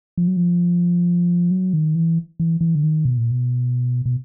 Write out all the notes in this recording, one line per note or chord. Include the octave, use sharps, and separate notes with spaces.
F3
F#3
F3
F#3
D#3
E3
E3
E3
D3
D#3
B2
A#2
B2
B2